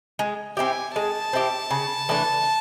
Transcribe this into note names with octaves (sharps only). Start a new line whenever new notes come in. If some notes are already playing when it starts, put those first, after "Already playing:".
G#3
C4 E4 G4 G#5
G#3 A5
C4 E4 G4
C#3
E3 A3 D4